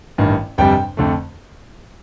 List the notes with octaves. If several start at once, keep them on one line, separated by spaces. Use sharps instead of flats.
A1 G2 D#3
G1 F2 C3 G3 G5
F2 D3 A3